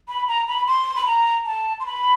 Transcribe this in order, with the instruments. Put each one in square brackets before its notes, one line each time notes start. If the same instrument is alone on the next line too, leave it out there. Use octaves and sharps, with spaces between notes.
[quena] B5
A#5
B5
C6
B5
A#5
A5
C6
B5